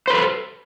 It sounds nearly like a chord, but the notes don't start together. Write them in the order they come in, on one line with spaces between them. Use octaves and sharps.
C5 B4 A4